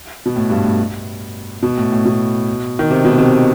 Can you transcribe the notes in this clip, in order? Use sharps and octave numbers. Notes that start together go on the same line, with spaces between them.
B2
A2
G2
A2
B2
A2
A2
B2
D#3
C3
B2
C3